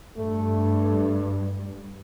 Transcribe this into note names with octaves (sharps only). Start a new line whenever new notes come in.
G2 A3